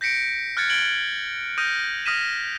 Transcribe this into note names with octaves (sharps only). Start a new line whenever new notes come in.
G6 A#6 B6 C#7 D7
F6 F#6 G#6 A6 C#7
G#6 D7 F#7 G7
D#6 F6 G6 A#6 D#7
D#6 F6 A#6 B6 D#7 E7